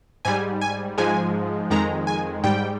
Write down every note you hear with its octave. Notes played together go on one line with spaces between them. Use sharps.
G#2 G3 G#5
G#5
G#2 F3 G#3 G#5
F2 D#3 G#3 A#5
G#5
G#2 G3 G5